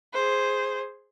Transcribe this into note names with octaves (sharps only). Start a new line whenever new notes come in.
G#4 C5